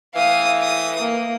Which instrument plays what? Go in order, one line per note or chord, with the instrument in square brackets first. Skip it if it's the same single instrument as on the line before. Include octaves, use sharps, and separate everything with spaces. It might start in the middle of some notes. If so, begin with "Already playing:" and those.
[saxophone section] A2 E3 [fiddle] F5 D#6
[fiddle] D#6
A#3